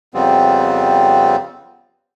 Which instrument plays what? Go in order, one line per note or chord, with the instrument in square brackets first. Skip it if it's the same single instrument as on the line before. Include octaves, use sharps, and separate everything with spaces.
[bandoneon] F2 C#3 G3 B3 C4